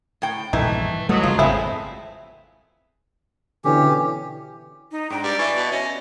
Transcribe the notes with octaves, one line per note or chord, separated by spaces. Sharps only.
A2 G5
A#1 G2 D#3 E3 A3 D#4
F#3 G3 A3 B3 D#5
F1 C#3 G#3 F4
G#1 E2 B3 C4 E4 G#4 A4
B2 D3 E3 C#4 G4
D#4
G#2 D4 G5 A#5
G3 D5
E3 E5 C#6
B2
C#4 D#5